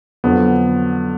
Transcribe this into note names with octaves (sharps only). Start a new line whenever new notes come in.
F2 D3 F#3 B3